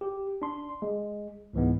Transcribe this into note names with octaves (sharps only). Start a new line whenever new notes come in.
G4
D4 C6
G#3
C#2 G#2 E3 G#3 B3